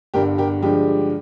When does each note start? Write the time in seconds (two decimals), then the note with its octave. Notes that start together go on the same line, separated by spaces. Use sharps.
0.14 G1 G2 D3 G4 A#4
0.38 G4 A#4
0.62 G2 D3 F3 G#3 G4